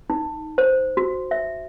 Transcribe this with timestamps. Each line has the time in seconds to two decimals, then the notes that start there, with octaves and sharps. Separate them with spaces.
0.10 D#4
0.58 C5
0.97 F#4
1.31 E5